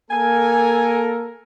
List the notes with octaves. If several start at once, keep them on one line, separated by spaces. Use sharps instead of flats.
A#3 A4 A#4 G#5